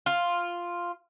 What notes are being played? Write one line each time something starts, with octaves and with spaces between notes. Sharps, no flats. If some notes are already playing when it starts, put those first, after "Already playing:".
F4